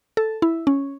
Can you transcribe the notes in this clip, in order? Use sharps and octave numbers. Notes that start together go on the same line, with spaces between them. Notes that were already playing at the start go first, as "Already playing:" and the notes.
A4
E4
C#4